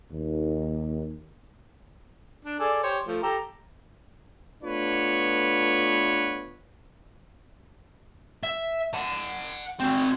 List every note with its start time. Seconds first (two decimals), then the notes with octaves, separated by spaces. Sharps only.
0.12 D#2
2.45 D4
2.59 G#4 A4 D5
2.83 G4 C5 C#5
3.07 F3 A3
3.23 G4 A4 A#5
4.63 A3 B3 D4 F4 B4 C#5
8.44 E5
8.94 F#5 A5
9.80 C4 F#4